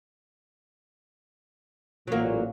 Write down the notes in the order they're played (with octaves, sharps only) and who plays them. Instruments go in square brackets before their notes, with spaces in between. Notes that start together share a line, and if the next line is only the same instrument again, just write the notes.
[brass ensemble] A1 A#2 [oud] F#3 A#3